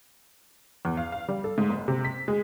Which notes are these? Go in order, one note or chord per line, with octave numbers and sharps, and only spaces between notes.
E2
F5
F5
G3
A4
G#2
F#1
C3
B6
G#3